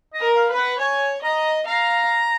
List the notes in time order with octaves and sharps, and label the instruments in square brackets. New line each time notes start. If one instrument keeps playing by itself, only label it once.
[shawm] D#5
[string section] A#4
[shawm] F5
[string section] B4
[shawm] F#5
[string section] C#5 [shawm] G#5
[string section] D#5 [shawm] A#5
[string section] F5 [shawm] A#5